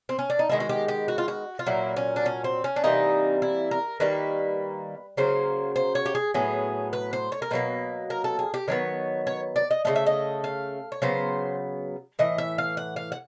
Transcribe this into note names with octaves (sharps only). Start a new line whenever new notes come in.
C4
C#4
D4
D#4
D#3 G#3 B3 E4
F#4
G4
G4
F#4
F4
F#4
F4
A#2 F#3 A#3 E4
C#4
D4
C#4
C4
C#4
D4
C3 E3 G3 A#3 D#4
E4
A#4
D#3 G3 A#3 B4
C#3 F#3 A#3 C5
C5
C#5
G4
G#4
A2 F#3 B3 G#4
B4
C5
C#5
A#4
B2 F#3 A#3 B4
A#4
A4
G#4
G4
D#3 F#3 B3 C#5
C#5
D5
D#5
C#3 F#3 A3 D#5
E5
D#5
F5
C#5
C#3 F#3 B3 C5
A2 E3 D#5
E5
F5
F#5
F5
F#5